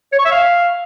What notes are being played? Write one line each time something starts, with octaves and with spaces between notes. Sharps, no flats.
C#5
C#6
E5
F5